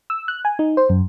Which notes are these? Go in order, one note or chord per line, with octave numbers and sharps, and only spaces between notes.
E6
F#6
G#5
D#4
C5
F#2